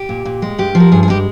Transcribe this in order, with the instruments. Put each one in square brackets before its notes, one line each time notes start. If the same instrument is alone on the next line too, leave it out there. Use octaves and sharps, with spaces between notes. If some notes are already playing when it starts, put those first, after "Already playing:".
Already playing: [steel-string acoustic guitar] G4
A#2
A#2
G#3
G2 G4
F3
A#4
G2 G#4
G#4
G#3 G4